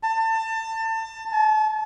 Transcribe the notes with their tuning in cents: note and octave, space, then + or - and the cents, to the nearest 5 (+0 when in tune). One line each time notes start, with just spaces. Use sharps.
A5 +25
A5 -40